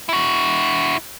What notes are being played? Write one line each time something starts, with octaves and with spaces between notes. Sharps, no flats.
E4 F#4